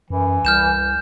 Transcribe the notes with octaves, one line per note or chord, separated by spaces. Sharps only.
F#2 E3
C2 F6 G6 E7